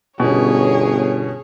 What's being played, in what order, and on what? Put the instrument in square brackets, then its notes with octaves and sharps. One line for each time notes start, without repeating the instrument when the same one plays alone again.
[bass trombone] G1 [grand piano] B2 C#4 [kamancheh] G#4 C#5